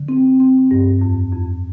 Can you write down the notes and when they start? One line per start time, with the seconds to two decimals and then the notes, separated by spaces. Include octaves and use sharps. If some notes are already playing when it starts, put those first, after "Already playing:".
Already playing: D3
0.08 C4
0.40 C4
0.71 G2
1.02 F2
1.33 F2